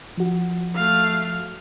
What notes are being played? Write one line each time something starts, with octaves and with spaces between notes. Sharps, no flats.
F3 F#4
A3 F5